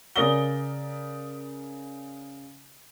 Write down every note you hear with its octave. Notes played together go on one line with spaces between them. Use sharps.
C#3 A#4 D5 D#6 A#6 G7